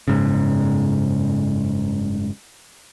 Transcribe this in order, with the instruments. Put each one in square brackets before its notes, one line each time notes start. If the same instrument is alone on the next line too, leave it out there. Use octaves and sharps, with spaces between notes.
[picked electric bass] F#1 G#2 C#3